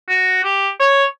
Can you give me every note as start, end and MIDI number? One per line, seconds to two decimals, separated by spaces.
0.09 0.40 66
0.44 0.69 67
0.80 1.04 73